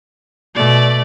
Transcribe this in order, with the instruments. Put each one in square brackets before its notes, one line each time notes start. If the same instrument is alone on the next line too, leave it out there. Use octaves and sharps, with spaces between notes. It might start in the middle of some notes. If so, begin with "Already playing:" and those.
[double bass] B2 [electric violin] A3 D5